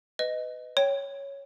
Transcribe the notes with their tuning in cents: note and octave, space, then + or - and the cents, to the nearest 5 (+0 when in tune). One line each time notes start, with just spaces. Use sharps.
B4 +25 D#5 +0
C#5 +0 G5 +0